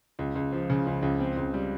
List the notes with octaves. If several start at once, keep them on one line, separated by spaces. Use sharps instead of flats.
C#2
C#2
F3
C#3
C#2
C#2
C4
C#2
G3